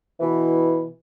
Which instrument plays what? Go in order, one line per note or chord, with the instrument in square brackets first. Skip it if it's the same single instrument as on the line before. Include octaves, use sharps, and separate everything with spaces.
[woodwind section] B2 E3